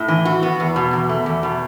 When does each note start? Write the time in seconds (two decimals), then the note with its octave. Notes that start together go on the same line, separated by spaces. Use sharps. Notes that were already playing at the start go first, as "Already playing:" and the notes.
Already playing: A2
0.08 E3
0.25 F#4
0.43 B3
0.60 E2
0.76 B2
0.93 E2
1.09 A3
1.26 E2
1.43 B2